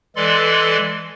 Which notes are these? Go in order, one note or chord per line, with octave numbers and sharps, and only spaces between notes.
E3 G#3 A4 D5 C6